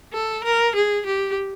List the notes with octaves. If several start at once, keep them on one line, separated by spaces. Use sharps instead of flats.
A4
A#4
G#4
G4